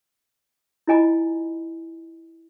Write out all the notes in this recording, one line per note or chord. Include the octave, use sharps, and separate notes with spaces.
E4 F4 D#5 G#5 A#5 B5